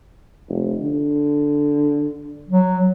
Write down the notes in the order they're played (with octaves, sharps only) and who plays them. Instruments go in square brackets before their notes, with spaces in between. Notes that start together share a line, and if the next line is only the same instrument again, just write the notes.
[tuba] F1
D3
[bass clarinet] F#3